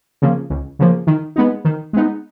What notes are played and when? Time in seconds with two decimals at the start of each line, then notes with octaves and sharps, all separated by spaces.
0.22 C#3 F3 A#3
0.50 C#2
0.79 C#3 F3 A#3
1.07 D#3
1.36 G#3 B3 D#4
1.65 D#3
1.93 G#3 B3 D#4